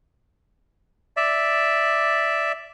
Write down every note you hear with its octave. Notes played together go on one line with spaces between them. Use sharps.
D5 E5